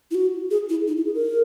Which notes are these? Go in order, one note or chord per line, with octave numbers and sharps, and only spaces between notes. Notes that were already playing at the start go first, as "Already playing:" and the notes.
E4
F#4
G#4
E4
D#4
E4
G#4
A#4